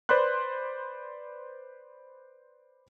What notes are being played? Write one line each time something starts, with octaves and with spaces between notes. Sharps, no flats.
B4 C5 D5 B5 C6 F#6